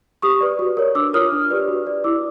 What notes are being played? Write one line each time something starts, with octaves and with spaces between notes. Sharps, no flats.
G4 C#6 D#6
B4 D5
F#4
A#4 C#5
D4 D6 E6
F4 A#4 C#5 D#6 F6
D4
G4 B4 D5
F#4
B4 D5
E4 D6 E6